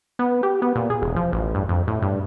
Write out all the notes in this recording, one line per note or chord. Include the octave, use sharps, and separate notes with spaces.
B3
G4
B3
A#2
G#4
E1
F3
A1
G2
F2
A2
G2